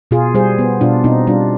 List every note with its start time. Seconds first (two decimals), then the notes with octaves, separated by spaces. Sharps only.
0.11 B2 F4 G#4
0.35 G3 G#4 C5
0.59 B3
0.81 B2 D4 F4
1.04 B2 C4 D#4
1.27 G3 D4 F4